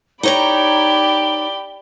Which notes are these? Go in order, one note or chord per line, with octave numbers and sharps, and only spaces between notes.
D#4 G4 C#5 D5 A#5 B5 G7